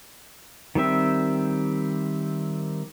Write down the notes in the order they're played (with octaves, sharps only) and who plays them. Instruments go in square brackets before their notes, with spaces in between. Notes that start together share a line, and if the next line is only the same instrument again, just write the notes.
[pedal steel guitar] D#3 G3 C4 E5